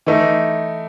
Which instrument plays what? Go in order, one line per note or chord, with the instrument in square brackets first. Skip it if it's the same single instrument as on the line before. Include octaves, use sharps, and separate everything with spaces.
[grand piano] E3 A3 D#4